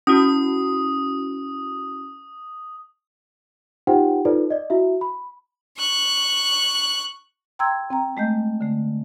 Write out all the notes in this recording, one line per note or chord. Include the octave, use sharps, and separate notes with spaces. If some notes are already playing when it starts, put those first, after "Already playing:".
C#4 E4 F#4 D#6
D#4 F4 G4 C5 F#5 G5
D#4 F4 A4 B4 C5 D5
D5 D#5
E4 F#4 E5
B5
C#6 F#6
G5 A#5 C6 E6 G#6
C4 G5 A#5
G#3 A3 D#5 G6
D3 A3